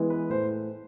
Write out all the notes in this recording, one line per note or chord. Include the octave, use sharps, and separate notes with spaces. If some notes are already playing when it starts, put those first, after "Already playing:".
Already playing: E3 G#3 B3
B4
A2 C5